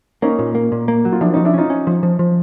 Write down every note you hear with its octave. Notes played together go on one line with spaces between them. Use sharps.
A#3 C#4 D#4
A#2
A#3
A#2
A#3
F#3
F4
F3 D4 E4
C#4 D#4
F3
D4 E4
C#4 D#4 F4
C#4
F3
F3
F3